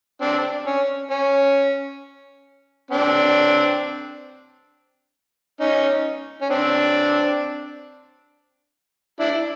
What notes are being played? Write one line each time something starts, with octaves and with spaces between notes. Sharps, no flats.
C4 D4
C#4
C#4
C4 D4
C#4 D#4
C#4
C4 D4
D4 E4